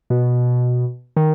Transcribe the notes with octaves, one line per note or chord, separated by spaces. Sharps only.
B2
D#3